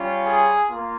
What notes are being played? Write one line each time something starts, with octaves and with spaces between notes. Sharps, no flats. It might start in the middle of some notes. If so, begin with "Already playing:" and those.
Already playing: G3 C#4 F4
G#4
A#3 F4